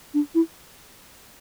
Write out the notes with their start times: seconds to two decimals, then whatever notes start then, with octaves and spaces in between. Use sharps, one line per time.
0.14 D4
0.35 E4